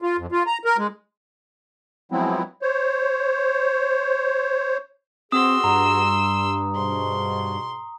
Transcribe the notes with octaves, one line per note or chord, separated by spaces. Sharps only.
F4
F2
F4
A#5
A#4
G#3
F3 F#3 G#3 B3 C4 E4
C5 C#5
B3 C4 F#4 G#4 C6 D#6 E6
G2 A#5
G#2 B2 C6